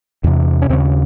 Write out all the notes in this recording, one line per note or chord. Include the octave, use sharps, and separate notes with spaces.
E2 C3
C#4
D#2 C#3 C4